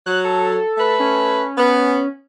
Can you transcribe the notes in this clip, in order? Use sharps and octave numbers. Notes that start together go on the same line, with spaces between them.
F#3 F#6
A4
A3 B4
C#4
B3